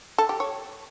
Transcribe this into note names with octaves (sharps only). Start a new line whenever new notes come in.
A4
G4
C#5